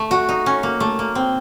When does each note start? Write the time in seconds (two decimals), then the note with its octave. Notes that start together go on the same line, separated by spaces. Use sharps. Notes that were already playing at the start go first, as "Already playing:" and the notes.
Already playing: A3
0.11 F#4
0.29 D#4
0.46 C#4
0.63 A#3
0.80 A3
0.99 A#3
1.15 C4